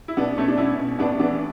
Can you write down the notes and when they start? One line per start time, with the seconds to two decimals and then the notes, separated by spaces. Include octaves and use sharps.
0.08 E4
0.17 B2 B3 D4
0.37 B2 A3 C#4
0.48 D4
0.58 B2 C#4 E4
0.79 B2
0.99 A2 B3 D4
1.19 E3 B3 D4